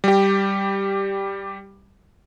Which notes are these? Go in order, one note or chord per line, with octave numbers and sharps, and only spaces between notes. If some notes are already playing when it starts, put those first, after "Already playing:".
G3 G4